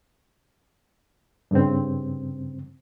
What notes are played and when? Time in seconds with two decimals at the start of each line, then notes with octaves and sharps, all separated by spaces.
1.51 G2 C#3 C4